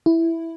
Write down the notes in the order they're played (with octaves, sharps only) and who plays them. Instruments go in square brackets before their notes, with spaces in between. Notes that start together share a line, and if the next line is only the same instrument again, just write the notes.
[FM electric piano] E4